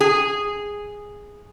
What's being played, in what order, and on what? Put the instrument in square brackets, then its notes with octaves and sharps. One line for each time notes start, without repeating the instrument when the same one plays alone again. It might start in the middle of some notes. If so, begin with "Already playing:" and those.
[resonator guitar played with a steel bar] G#4